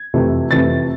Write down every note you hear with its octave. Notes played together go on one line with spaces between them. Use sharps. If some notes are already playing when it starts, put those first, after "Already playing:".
Already playing: G#6
F2 C3 E3 A3
F2 C3 E3 A3 A6